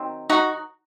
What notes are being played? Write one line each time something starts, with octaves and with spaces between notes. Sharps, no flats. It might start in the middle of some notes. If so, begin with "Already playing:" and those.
Already playing: D#3 F#3 C4
D#4 F#4